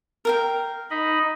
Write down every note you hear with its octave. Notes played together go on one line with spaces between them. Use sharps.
A#4 F5 G5
D#4 D#5 B5